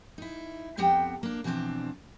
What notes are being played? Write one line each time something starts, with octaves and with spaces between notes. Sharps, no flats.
D#4 E4
F2 B3 C4 G4 F#5 G5
A#3 D4
B2 E3 F3 A#3 C4 D4